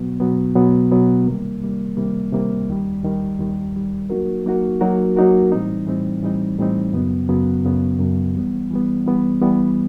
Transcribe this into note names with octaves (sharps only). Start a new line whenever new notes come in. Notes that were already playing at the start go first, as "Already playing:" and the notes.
Already playing: B2 F#3 B3
B2 F#3 B3
B2 F#3 B3
B2 F#3 B3
C3 D#3 G3 A#3
C3 D#3 G3 A#3
C3 D#3 G3 A#3
C3 D#3 G3 A#3
D#2 D#3 G3
D#2 D#3 G3
D#2 D#3 G3
D#2 D#3 G3
F#3 A#3 D#4 F#4 A#4
F#3 A#3 D#4 F#4 A#4
F#3 A#3 D#4 F#4 A#4
F#3 A#3 D#4 F#4 A#4
A2 E3 G3 C4 D#4
A2 E3 G3 C4 D#4
A2 E3 G3 C4 D#4
A2 E3 G3 C4 D#4
F#2 C#3 F#3 B3
F#2 C#3 F#3 B3
F#2 C#3 F#3 B3
F#2 C#3 F#3 B3
E3 G3 B3
E3 G3 B3
E3 G3 B3
E3 G3 B3